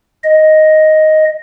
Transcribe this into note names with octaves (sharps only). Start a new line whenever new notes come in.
D#5